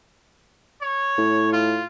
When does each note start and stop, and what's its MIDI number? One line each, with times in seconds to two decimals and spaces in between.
0.82 1.51 73
1.18 1.81 45
1.52 1.85 65